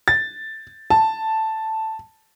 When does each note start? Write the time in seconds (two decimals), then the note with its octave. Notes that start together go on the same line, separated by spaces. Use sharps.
0.08 A6
0.90 A5